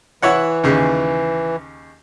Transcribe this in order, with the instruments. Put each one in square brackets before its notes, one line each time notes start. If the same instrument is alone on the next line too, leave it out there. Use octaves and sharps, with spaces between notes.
[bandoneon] E3 [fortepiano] E4 C#5 F#5
[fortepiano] D#2 C#3